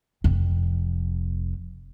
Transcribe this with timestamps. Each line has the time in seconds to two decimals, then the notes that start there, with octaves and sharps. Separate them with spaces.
0.24 F1 F2